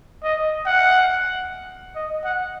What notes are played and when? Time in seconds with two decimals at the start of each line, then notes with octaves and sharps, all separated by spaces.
0.23 D#5
0.66 F#5
1.95 D#5
2.24 F#5